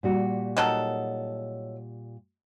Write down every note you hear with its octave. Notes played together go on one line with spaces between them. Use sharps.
A#2 G3 F#4
D#3 F#3 A4